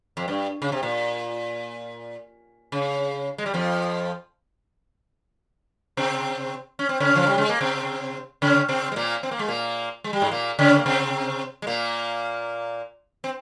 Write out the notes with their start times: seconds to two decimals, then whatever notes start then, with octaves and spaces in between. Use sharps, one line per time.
0.17 F2
0.28 G2
0.62 C#3
0.72 C3
0.83 A#2
2.72 C#3
3.38 G#3
3.46 G3
3.54 F2 F3
5.97 C3 C4
6.79 C#4
6.89 C4
7.00 C#3 C#4
7.16 F3
7.27 G3
7.38 G#3
7.49 A#3
7.61 C3 C4
8.42 C#3 C#4
8.69 C3 C4
8.92 G#3
8.96 A#2 A#3
9.23 C4
9.31 A#3
9.39 G#3
9.48 A#2 A#3
10.04 G#3
10.13 G3
10.21 G#2 G#3
10.32 A#2 A#3
10.59 C#3 C#4
10.79 A#3
10.86 C3 C4
11.62 G#3
11.67 A#2 A#3
13.24 C4